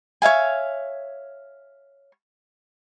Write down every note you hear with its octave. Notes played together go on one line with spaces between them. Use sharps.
C#5 E5 F5 G#5